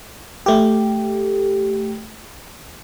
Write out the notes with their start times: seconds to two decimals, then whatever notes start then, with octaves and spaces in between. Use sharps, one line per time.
0.46 A3 G4